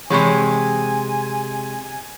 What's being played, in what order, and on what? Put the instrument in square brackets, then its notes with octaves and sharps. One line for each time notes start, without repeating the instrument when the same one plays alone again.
[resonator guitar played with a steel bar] C3 G#3 [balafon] E3 B5 C#6 [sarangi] G#5